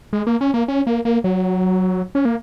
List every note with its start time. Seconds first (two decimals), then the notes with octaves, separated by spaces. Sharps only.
0.13 G#3
0.27 A#3
0.41 C#4
0.54 A#3
0.68 C#4
0.87 A#3
1.05 A#3
1.24 F#3
2.15 C#4
2.25 A#3